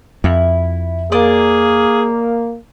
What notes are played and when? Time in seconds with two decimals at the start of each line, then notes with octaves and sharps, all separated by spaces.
0.24 F2 E4
1.12 A#3 G#4 D5 D#5 D#6